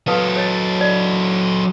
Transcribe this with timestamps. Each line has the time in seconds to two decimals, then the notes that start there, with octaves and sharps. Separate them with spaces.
0.08 F#3 A4 B4 F5 D#6
0.36 C#5 D#5
0.81 D5